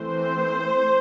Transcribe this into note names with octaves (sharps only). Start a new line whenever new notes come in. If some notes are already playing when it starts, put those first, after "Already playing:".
Already playing: E3 A3 C4 C5